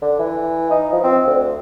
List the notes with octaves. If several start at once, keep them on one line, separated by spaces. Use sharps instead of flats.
D3
E3
D#4
F3
C4
D2